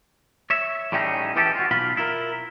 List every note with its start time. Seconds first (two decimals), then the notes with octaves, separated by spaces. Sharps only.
0.50 C#5 E5
0.92 A2 G3 A3 C#4 D#4 G#4
1.36 E3 F3 C#4 G4 A4
1.55 F4 F#4
1.71 B1 F4 F5 B5
1.97 E4 F4 A#4